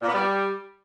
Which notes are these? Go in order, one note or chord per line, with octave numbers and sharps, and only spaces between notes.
A#2
B3
G3